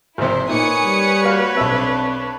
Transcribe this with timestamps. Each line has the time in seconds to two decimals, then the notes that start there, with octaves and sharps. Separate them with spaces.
0.18 G#1 C3 E4 C5
0.49 A#2 D#4 B4 C#5 G#5 D#6 C#7
0.85 G3
1.25 A#3 F#4 F5
1.57 B1 C4 D4 E5